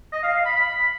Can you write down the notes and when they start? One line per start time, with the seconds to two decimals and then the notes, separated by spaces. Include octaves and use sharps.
0.12 D#5
0.23 F5
0.34 F5
0.45 B5
0.56 B5